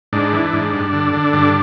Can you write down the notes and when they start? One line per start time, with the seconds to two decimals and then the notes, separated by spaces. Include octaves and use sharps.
0.13 G#2 D4
0.33 E3
0.53 G#2
0.73 G2
0.93 D3
1.13 D3
1.33 G2 D4